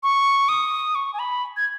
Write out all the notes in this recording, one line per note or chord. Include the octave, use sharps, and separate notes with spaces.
C#6
D#6
C#6
G#5
B5
G#6